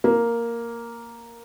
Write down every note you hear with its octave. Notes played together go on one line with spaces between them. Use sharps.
A#3